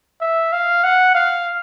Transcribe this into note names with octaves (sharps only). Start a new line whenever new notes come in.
E5
F5
F#5
F5